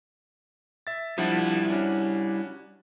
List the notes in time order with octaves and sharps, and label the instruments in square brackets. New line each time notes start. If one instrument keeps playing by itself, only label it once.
[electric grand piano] E5 A6
[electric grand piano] F3 D4 F#5 [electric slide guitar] G3 E4
[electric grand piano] C#4 D4 F#4